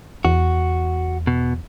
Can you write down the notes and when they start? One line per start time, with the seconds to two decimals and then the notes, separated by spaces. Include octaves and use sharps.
0.25 E2 F#4
1.27 B2